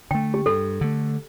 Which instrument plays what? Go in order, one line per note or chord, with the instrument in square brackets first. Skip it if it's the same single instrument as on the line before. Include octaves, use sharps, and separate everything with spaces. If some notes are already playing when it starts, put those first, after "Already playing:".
[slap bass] D3 A3 [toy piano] G5
[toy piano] G4
[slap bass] G2 [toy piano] A4
[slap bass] D3 A3